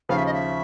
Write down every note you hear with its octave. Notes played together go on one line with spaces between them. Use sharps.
D#2 C#3 F3 F5
E5
D#5
E5